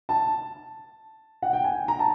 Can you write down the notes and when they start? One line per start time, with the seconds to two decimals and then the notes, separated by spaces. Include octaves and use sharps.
0.09 A5
1.42 F#5
1.53 G5
1.64 G#5
1.88 A#5
1.99 A5